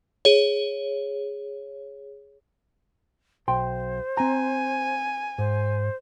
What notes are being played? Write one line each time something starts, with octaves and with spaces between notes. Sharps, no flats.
G#4 C#5
B1 C5 G5 C6
C4 G#5 A#5
G#2 C5